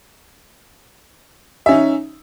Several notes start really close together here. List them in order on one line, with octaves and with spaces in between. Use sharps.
E5 C#4 D#4